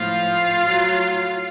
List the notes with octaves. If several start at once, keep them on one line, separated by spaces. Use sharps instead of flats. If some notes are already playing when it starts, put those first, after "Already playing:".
Already playing: A2 F3 F4 F5
A2 F#3